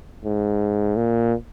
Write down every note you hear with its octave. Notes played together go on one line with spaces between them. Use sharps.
G#2
A#2